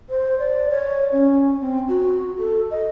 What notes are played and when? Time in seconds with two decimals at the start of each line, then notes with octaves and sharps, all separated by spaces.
0.09 C5
0.39 D5
0.69 C#5
1.12 C#4
1.61 C4
1.88 F#4
2.39 A4
2.71 D#5